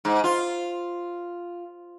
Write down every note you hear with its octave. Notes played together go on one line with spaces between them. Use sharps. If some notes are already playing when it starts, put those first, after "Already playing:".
G#2
F4